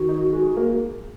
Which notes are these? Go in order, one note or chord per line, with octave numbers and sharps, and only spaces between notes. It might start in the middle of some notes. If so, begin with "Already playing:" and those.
Already playing: D#3 F#4
D#4
G#3
A#3